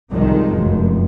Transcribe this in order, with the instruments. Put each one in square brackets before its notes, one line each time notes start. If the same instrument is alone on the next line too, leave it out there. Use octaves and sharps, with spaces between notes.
[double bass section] C2 D#3 F3 G#3
F1 F#2